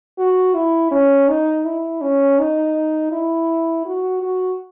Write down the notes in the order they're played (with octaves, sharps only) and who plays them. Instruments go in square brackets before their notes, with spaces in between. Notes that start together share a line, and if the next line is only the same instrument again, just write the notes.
[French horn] F#4
E4
C#4
D#4
E4
C#4
D#4
E4
F#4
F#4